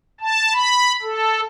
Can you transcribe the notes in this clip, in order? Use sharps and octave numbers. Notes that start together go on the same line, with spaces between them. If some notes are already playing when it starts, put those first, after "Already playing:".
A5
B5
A4